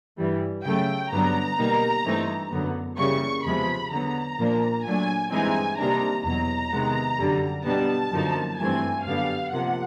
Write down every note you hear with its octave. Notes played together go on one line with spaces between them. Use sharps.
G2 E3 G3
C#3 F#3 A3 G5
G2 D3 F#3 B3 D4 A#5
B2 G3 A#3 D#4
G2 E3 A3 C4 D#4
F#2 D3 F#3 B3
C#3 E3 G3 A#3 C#6
E2 C3 F3 G#3 B5
D3 F#3 B3 A#5
A#2 F3 A#3 D4
A#2 F#3 A3 D4 G#5
G2 E3 G#3 C4 D#4 G#5
C3 D#3 G3 A#3 D4 A#5
E2 B2 F#3 A#5
C3 D#3 G#3 B3
F#2 D3 G3
B2 G3 B3 D4 A5
F#2 D3 F3 A#3 D#4
G2 E3 A3 C4 G#5
F#2 D3 G3 B3 F5
C3 F3 A#3 F#5